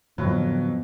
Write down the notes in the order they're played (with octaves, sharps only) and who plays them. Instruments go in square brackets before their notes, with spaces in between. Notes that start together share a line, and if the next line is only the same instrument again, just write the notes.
[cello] F2 [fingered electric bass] A2 D3 [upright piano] F#3 [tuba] B3